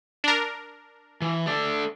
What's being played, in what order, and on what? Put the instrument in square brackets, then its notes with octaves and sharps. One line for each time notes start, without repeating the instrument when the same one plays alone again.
[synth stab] D4 A#4
[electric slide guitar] E3
A3 A4 D5